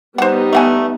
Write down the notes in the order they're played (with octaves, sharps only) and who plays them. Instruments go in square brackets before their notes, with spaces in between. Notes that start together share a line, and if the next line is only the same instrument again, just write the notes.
[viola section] G3 B3 D#4 [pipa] C5 F#5
[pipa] A3 F#5 G#5